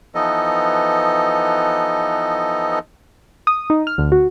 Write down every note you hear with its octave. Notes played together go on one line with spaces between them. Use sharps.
E3 F3 B3 D#4 A4 D#5
D#6
D#4
F6
D2
F#4